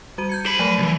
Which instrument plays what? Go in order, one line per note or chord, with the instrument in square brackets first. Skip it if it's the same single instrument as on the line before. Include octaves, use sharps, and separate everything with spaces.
[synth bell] G3 F#4 D#7
G6 G#6 C#7
[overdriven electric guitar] C5 B5
[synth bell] F3 F#3 A3
[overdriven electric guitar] C#2 E3